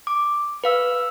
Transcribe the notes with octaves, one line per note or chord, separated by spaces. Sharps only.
D6
B4 F5 E6